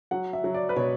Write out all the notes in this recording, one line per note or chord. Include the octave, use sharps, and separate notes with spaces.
F#3 F#5
E5
F#3
D5
B4
B2 C#5